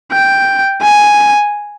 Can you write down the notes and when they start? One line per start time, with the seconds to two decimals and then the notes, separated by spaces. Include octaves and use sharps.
0.12 G5
0.83 G#5